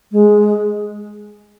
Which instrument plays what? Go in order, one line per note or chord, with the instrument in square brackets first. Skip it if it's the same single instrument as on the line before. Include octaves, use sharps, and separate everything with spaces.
[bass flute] G#3